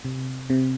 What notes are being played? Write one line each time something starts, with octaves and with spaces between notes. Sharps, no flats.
C3
C3